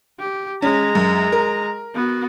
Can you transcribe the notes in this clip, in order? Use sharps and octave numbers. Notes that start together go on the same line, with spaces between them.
G4
G#3 C#4 A#5
F#2
A#4
B3 F#4